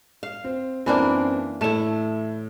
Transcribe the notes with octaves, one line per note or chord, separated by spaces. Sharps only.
F5
C4
F#2 E3 A#3 C4 D4 B5
A2 A3 E4 E7